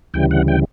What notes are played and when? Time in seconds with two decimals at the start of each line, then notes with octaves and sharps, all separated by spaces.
0.14 D2 C#3 E3 G3 G5
0.31 F#5
0.48 G5